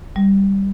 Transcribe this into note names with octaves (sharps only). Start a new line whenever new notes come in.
G3